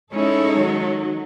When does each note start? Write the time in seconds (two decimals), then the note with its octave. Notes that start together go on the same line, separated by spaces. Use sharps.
0.12 G#3 C#4 D#4 E4 A4 C#5
0.57 D#3 F#3